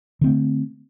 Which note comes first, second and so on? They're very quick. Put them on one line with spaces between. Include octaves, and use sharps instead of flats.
D3 C4 A3